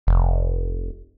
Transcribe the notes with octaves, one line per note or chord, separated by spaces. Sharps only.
F1